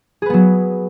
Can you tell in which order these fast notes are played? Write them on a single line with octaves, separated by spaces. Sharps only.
G#4 B4 B3 F#3